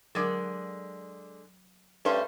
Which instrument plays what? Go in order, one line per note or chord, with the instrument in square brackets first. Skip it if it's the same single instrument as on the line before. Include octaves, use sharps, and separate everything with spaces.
[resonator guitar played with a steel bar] D3 G#3 D5 [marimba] F#3 A#4
[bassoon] G2 [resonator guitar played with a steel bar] A3 C#4 C5